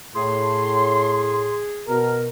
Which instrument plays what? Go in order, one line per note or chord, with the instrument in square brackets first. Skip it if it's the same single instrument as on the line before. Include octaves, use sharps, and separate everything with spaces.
[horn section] A2 [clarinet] G#4 [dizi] C6
[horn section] B2 A#4